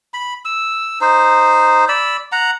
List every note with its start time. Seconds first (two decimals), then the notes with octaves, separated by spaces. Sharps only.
0.14 B5
0.45 E6
1.01 D#4 C5
1.88 D5 B5 E6
2.32 F#5 A#5